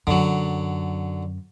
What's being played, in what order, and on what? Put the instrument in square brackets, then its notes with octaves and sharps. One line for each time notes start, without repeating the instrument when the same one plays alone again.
[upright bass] F#2 [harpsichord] D3 F#3